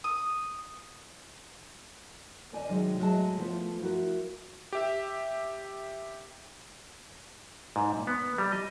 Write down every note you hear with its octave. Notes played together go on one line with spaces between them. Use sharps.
D#6
D#2 C5 D5 D#5 G#5
C3 D#3 F#3 G#3
A2 F#3 G#3 F#4 D#5 A5
F3 A3 B3 F4 C5
F3 E4 F#4 A#4
G4 E5
G#2
A#2
B3
G3
D#5